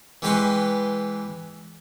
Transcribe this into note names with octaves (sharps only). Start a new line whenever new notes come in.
E3 G#3 G4 B4 C6 C#6